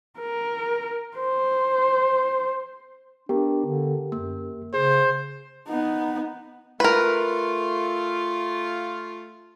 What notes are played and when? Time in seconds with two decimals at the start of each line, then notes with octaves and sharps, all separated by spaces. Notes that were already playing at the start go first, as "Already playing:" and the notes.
0.19 A#4
1.17 C5
3.29 B3 D4 G4 A#4
3.66 D3
4.12 F#2 A#3
4.74 C#3 G#4 C5
5.68 B3 D#4
6.80 A3 F4 A#4 B4